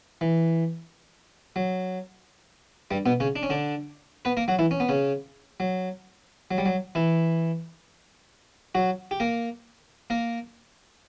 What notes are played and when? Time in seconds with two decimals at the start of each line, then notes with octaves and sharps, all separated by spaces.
0.21 E3
1.56 F#3
2.91 G2 G3
3.06 B2 B3
3.20 C#3 C#4
3.36 D4
3.43 C#4
3.50 D3 D4
4.25 B3 B4
4.37 A#3 A#4
4.48 F#3 F#4
4.59 E3 E4
4.71 C#4
4.80 B3
4.89 C#3 C#4
5.60 F#3
6.51 F#3
6.58 G3
6.66 F#3
6.95 E3 E4
8.75 F#3 F#4
9.11 G4
9.20 A#3 A#4
10.10 A#3 A#4